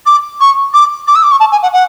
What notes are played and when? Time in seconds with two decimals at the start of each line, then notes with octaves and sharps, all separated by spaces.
0.06 D6
0.40 C#6
0.73 D6
1.07 D6
1.15 E6
1.23 D6
1.31 C#6
1.40 A5
1.51 G#5
1.62 F#5
1.73 F#5